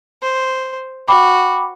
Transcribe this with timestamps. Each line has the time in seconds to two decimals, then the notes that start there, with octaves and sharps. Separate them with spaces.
0.22 C5
1.08 F#4 G5 B5 D6